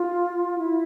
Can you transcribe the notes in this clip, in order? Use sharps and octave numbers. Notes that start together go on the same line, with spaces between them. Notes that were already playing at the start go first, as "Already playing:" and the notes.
Already playing: F4
E4